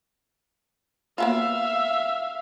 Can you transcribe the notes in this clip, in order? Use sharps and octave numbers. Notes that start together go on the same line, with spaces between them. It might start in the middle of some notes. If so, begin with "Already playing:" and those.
A#3 B3 F4 E5 F5